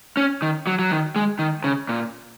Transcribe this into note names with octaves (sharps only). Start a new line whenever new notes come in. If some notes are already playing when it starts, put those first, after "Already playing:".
C#4
D#3
F#3
F#3
D#3
G#3
D#3
C#3
A#2